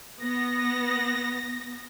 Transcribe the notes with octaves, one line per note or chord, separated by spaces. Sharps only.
B3 A#6